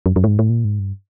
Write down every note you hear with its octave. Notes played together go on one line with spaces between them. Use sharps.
F#2
F#2
A2
G#2
A2
A#2
G#2
G2